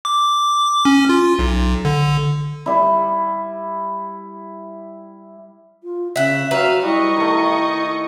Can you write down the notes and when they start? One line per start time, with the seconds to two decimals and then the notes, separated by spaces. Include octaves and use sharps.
0.05 D6
0.85 C#4
1.09 F4
1.39 B1
1.85 D3
2.66 G3 E4
5.83 F4
6.16 C#3 E5 F#5
6.51 F#3 F#4 B4 E5 F5
6.83 G3 E4 D#5 C#6
7.16 D#3 A3